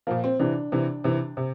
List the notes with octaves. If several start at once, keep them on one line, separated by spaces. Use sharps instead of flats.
A#2 F3 A#3
C4
C3 E3 D4
C3 E3
C3 E3
C3